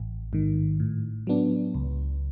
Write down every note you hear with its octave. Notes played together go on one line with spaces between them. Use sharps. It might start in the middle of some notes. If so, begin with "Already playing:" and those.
Already playing: A1
G#2 D#3
A2
F#3 B3 D4
C#2